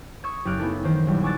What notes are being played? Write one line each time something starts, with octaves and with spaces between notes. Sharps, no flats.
C#6 D#6 E6 G#6
F#1 G4 D6 F6 F#6 D7
A3 B3 D#4 E4 G#4 A4
D#3 E3 C5
A#1 F#3 G3
G#5 C#6 D6 E6 F#6 A6